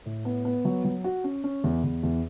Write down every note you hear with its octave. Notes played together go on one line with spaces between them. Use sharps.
A2
B3
B3
F#3
F#3
F#4
C#4
C#4
E2
E2
E2